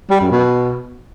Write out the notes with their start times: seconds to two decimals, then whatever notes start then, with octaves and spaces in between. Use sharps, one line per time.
0.10 G3
0.21 F#2
0.31 B2